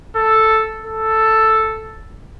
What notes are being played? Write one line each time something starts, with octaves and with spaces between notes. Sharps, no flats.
A4
A4